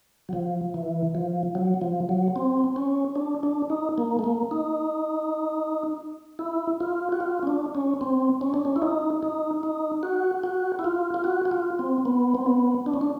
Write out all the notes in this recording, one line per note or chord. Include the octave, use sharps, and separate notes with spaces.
F#3
F3
E3
F3
F#3
F3
F#3
C4
C#4
D4
D4
D#4
A#3
A3
A#3
D#4
E4
F4
F#4
F4
C#4
D4
C#4
C4
C#4
D4
C#4
E4
D#4
D#4
D#4
F#4
F#4
E4
F4
F4
F#4
F#4
F4
C4
B3
C4
B3
D4
C#4
D4